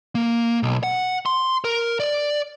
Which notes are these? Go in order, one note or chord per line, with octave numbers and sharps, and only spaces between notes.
A#3
B1
F#5
C6
A#4
D5